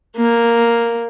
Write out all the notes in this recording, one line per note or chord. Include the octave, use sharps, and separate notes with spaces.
A#3